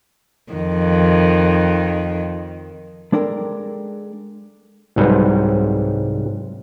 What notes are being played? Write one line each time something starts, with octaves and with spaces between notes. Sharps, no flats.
F2 D#3
G#3 D4 A4 A#4 G5
C2 G#2 F#3 G3 C4 B4